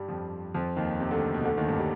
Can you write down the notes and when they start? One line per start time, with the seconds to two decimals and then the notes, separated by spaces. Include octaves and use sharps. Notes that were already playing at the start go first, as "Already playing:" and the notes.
Already playing: G2 G3
0.08 F2 F3
0.54 F2 F3
0.76 D#2 D#3
1.00 C3
1.11 D2 D3
1.34 B2
1.45 D2 D3
1.57 D#2 D#3
1.68 G2 G3
1.80 G3